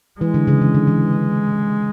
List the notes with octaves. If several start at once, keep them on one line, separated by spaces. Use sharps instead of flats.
E3 G#3
D3
C#3
E3
D3
E3